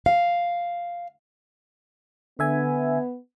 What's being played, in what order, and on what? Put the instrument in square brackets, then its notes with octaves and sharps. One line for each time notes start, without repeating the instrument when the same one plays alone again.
[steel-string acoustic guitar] F5
[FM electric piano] D3 E5 G#5 [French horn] B3